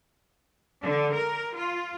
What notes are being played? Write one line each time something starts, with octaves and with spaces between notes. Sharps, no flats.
D3
A#4
F4